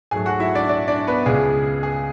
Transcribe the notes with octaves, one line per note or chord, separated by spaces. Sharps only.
G#2 F#3 A3 G#4 G#5
F#4 F#5
E4 E5
D4 D5
D4 D5
D4 D5
B3 B4
C#2 C#3 G#3 G#4
G#4